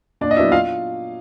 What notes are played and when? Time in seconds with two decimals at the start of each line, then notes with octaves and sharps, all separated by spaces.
0.21 A#2 D4 D5
0.31 D#5
0.36 F#3 B3 D4 E4 E5
0.52 F4 F5